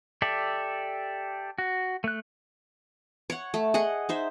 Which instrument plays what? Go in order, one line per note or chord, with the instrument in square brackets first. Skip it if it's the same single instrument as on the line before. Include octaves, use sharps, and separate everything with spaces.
[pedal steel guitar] G4 A4 D5 E5
F#4
A3 F#6
[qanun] C#5 F#5
A3
G#4 D#5 F#5
D#4 C5 E5